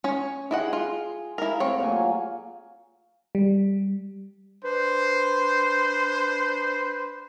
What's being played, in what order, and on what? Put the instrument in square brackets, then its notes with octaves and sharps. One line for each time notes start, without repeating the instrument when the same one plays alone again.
[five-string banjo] C#4 C#5
[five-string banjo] E4 D#5 F#5 [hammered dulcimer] G#4 G5
[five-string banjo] F4
[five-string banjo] E4 A#4 [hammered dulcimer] F5 A5
[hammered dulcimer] A2 [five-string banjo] C4 C#5
[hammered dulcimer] A#2 F#3 G#5
[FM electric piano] G3
[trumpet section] D4 C5 [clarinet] B4